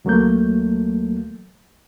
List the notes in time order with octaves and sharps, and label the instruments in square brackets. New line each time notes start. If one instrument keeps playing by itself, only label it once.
[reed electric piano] D2 F#3 A3 A#3 G6